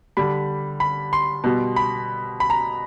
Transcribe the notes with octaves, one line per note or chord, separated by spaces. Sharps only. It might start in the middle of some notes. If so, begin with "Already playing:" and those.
D3 G3 B5
B5
C6
B2 G3
B5
B5
A#5